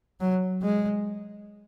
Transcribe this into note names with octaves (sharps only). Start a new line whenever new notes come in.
F#3
G#3